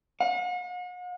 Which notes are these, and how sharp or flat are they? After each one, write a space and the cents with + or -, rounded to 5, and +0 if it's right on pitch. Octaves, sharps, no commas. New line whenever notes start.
F#5 -45